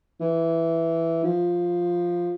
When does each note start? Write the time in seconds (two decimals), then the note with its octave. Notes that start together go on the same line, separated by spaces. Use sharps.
0.21 E3
1.24 F3